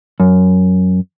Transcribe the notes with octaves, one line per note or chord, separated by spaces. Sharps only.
F#2